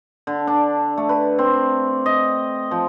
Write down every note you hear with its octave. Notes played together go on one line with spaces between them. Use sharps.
D3
D4
A3
B4
C4
D#5
F3